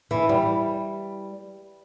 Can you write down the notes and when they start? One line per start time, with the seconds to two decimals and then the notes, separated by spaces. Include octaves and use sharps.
0.11 E3
0.29 G3